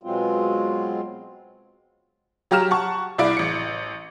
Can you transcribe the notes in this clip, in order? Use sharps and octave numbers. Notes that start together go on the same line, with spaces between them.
B2 F#3 G#3 C4 F4
F#3 G4 A#5 F6 E7
F#5 A5 C#6
C2 E4 D5 D7
A1 C#7